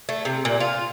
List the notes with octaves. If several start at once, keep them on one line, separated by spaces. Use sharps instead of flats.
A3
C3
A#2
F4